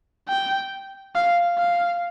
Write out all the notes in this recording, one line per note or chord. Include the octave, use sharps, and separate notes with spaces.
G5
F5
F5